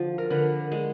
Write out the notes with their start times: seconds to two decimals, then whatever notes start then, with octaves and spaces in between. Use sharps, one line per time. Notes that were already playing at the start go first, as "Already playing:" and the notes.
Already playing: D3 F3
0.18 A#4
0.30 D3 B4
0.71 G#3